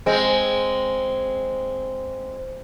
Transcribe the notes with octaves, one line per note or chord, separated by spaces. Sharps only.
G#3 C4